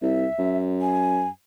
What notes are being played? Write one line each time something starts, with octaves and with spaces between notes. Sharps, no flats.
C2 E5
F#2
G#5